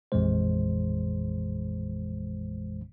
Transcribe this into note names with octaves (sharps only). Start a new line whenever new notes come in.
A1 F2 A#2 E3 G#3 C5